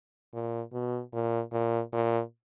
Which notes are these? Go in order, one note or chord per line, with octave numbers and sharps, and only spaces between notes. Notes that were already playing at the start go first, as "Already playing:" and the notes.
A#2
B2
A#2
A#2
A#2